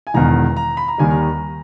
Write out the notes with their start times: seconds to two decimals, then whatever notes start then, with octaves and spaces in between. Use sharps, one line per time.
0.07 G#5
0.14 E1 E2 D#3 A#5
0.57 A#5
0.77 B5
0.88 A#5
0.98 D#2 D#3 G3 G#5
1.11 A#5